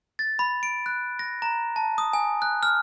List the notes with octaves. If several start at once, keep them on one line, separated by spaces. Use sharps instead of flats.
A6
B5
D7
F#6
A#6
A#5
A5
D#6
G#5
F#6
F6